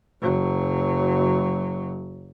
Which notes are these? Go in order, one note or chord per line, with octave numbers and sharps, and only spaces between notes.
F#1 F#3